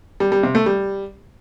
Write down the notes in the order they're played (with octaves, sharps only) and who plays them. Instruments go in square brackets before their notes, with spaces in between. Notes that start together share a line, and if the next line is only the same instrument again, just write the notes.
[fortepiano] G3
G3
C3
A3
G3